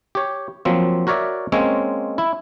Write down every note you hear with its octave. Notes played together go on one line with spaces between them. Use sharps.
G4 C#5
F3 F#3 A#3 C4
F#4 A#4 C#5 D5 E5
G#3 A#3 C4 C#4 C#5
E4